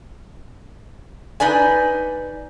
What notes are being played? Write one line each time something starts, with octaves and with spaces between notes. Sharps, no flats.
D#4 B4 D5 G#5